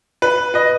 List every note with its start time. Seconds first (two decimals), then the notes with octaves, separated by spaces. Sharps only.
0.22 B4
0.54 B4 D#5